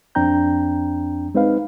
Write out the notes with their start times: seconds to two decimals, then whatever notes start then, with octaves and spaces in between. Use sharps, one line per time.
0.15 F2 C4 D4 G5 A#5 G6
1.35 G#3 C4 D#4 B4 F5